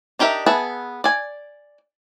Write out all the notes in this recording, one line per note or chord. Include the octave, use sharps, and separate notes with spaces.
D4 D#4 G4 A#4 E5
B3 G#4 B4 E5 A5
D5 G#5